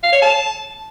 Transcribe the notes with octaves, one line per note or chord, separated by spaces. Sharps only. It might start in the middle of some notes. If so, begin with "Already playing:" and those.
F5
C#5
A5